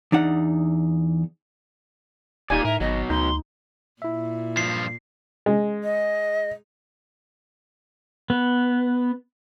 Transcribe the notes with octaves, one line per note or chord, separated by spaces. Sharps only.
E2 D4 D#4 F#5
D#1 A#3 D#4 F4 G4 D5 G#5
A2 A#4 E5
G#1 B2 F#3 D#5
D2 D#4 C6
A#2 E4 E5
G2 F3 C7
G#3
D#5
B3